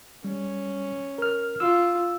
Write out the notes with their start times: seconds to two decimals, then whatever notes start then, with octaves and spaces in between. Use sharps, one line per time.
0.24 G3 C#4
1.18 A#4 F6
1.60 F4 E6